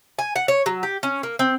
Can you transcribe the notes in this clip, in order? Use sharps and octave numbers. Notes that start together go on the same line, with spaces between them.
G#5
F#5
C#5
F#3
G4
C#4
A#3
C4